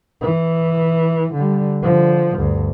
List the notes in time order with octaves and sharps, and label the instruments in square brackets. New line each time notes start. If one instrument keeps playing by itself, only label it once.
[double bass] E3
D3 G3
D3 F3
D2 G2